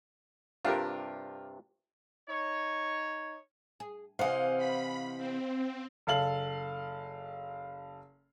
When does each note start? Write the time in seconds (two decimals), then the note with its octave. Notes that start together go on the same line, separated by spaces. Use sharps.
0.65 G2 C3 D4 F4 G4 A#4
2.29 D#4 C#5
3.80 G#4
4.19 C3 E3 C5 D#5 F5 F#5 G#5
4.58 B5
5.18 C4
6.07 F#1 A4 F5 F#7